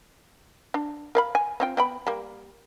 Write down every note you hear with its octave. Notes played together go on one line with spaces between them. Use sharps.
D4
A#4 F5 B5
G#5
C4 F4 G5
B3 G5 B5
G3 A#3